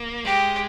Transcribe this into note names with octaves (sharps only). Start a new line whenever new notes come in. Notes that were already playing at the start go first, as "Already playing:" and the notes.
Already playing: A#3
G#3 G4